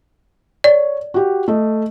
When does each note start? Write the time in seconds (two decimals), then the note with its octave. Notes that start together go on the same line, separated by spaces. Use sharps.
0.64 C#5 D5
1.14 F#4 G4
1.48 A3 D#5